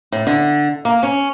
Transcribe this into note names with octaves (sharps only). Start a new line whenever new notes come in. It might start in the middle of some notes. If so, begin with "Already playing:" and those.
A2
D3
A#3
C#4